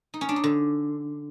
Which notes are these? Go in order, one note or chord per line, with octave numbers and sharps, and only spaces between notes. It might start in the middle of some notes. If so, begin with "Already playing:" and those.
D#4
C#4
D4
D#4
D3